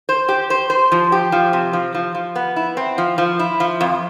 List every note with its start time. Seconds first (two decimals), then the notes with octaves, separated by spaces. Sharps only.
0.09 C5
0.29 G4
0.50 C5
0.70 C5
0.92 F3
1.12 G4
1.32 F3
1.53 C3
1.73 F3
1.94 F3
2.15 F3
2.36 B3
2.56 E4
2.77 C4
2.98 F3
3.18 F3
3.39 E4
3.60 F3
3.81 F2